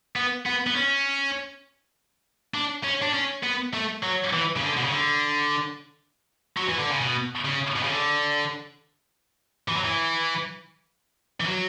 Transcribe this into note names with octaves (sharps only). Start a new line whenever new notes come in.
B3
B3
B3
C#4
D4
C#4
D4
C#4
B3
A3
F#3
E3
C#3
D3
B2
C#3
D3
F#3
E3
D3
C#3
B2
C#3
B2
C#3
D3
E3
F#3
E3
E3
F#3